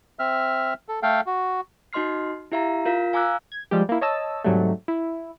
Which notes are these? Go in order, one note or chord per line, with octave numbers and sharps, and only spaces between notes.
C4 E5 F6
A4
A3 A4 F5 G5
F#4
D#4 F#4 D#5 C6 F6 C7
E4 G4 E5 F5 A#5
F4 A#4 F5 B6
F5 G#5 A#5 D6 E6 F#6
G#6
F3 G3 G#3 G4
A#3 E4
C#5 D#5 A5 E6
G#2 C3 F#3 G3 A3
E4